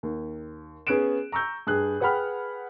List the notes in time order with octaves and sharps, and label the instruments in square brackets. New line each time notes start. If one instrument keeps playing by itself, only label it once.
[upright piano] D#2
B3 C#4 G#4 F#6 D7 E7
A#5 C#6 E6 G6
G2 G#4 F#6
G#4 B4 F#5 G5 B5 F6